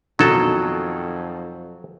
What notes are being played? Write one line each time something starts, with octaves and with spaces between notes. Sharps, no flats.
F2 B2 D#3 F#3 A4